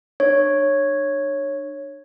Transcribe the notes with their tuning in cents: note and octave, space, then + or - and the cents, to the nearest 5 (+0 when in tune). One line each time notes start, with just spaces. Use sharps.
D4 +35 C#5 -5